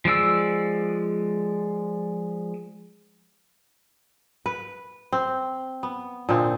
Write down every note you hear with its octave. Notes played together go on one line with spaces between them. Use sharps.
F3 G#3 D5 E6
B4
C4
B3
A#2 D3 C4 D#4